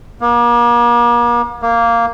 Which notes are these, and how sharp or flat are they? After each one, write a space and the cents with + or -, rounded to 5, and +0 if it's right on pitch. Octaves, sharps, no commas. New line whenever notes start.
A#3 +40
A#3 -5